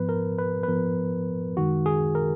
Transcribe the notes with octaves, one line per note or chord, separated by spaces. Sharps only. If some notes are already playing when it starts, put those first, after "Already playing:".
Already playing: G#2 F3 B3 B4
A#4
B4
B4
G#2 F3 B3 A#4
F#2 D#3 G#3 F#4
G#4
A#4